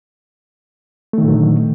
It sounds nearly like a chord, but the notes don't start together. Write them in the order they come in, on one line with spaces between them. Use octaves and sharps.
A3 D#3 A#2 F#3 D3